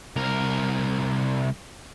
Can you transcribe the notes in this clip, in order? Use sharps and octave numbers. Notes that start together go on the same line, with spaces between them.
C2 A#4